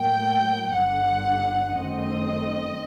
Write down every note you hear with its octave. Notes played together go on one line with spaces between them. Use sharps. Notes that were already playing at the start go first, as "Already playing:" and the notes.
Already playing: A2 F#3 A#3 G5
G1 G2 D3 F#5
G1 F#2 D#3 A3 C4 D#5